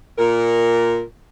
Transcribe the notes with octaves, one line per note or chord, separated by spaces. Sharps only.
A#2 A#4